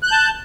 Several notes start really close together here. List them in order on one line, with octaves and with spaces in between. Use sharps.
F#6 G6 A5